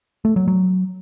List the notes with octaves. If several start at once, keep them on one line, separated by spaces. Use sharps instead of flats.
A3
F#3
F#3